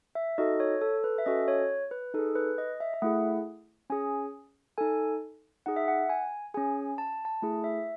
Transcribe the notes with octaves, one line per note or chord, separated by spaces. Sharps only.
E5
D#4 F#4 A4 D#5
C#5
A4
B4
E5
C#4 F#4 A4 D#5
C#5
B4
D#4 G#4 A4
B4
D#5
E5
E5
A3 E4 G#4 F#5
C#4 G#4 G#5
D#4 A4 G#5
D#4 G#4 F#5
E5
F#5
G#5
C#4 G#4 G#5
A5
A5
A3 E4 G#4
E5